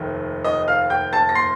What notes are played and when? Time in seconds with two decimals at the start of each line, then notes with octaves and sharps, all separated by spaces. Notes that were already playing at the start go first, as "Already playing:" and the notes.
Already playing: F1 D#2 D#3 A3
0.44 D#5 D#6
0.68 F5 F6
0.90 G5 G6
1.13 A5 A6
1.29 A#6
1.35 C6 C7